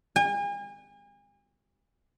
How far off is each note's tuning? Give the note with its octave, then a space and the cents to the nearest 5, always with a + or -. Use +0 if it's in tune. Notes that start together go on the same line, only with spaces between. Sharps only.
G#5 -40